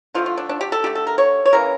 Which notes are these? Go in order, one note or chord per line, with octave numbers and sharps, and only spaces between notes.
D3 F3 A3 F4
F4
D4
D4
G4
A4
D3 A3 G4
A4
A#4
C#5
C#5
C#3 E3 A#3 A#4